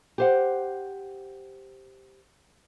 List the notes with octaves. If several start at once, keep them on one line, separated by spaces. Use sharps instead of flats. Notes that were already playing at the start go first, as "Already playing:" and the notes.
G4 C5 F#5